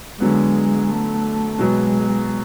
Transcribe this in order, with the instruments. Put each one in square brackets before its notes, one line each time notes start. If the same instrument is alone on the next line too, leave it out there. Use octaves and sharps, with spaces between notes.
[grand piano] D3 F#3 B3 [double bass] G#3
[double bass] A3
[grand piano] B2 F#3 B3 [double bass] G#3